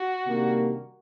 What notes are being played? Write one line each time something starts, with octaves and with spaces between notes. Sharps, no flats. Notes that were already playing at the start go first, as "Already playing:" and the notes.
Already playing: F#4
C3 D#3 G3 A#3 D4